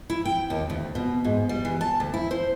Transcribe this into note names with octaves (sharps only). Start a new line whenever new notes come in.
E4
G5
D#2
D2
B2
G#2
G3
E3
A5
D2
E4
C5